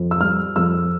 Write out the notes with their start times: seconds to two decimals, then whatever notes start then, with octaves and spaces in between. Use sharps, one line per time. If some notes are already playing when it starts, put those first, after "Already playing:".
Already playing: F2
0.11 E6
0.20 G3 F6
0.56 F2 E6